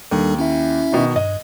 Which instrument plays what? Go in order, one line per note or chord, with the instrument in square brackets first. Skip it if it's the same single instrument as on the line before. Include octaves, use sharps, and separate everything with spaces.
[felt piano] D#2 [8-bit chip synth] G3 D4 A4
[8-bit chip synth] C#4 E4 E5
[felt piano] B2 D#3
[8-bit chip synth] G2 [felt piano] D#5